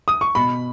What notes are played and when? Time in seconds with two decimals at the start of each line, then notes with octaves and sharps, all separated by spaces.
0.08 D#6
0.21 C#6
0.35 B2 B5